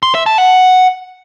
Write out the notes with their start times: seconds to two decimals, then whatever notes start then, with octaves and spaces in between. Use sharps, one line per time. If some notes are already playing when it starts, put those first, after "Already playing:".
0.03 C6
0.14 E5
0.26 A5
0.38 F#5